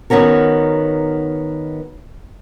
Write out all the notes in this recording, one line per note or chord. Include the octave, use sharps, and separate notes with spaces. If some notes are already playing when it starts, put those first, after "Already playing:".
D#3 B3 C#4 F#4 A#4